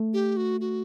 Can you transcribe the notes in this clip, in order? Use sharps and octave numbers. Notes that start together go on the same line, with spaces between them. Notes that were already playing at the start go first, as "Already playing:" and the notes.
Already playing: A3
G4
F#4
F#4